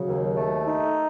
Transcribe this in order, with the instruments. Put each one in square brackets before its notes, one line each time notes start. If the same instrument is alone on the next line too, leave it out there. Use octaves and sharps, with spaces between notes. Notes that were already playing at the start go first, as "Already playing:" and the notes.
Already playing: [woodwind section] C#3 [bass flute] F#3
[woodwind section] D#2
A3
D#4